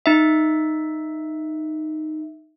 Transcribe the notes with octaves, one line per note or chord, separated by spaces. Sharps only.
D#4 E5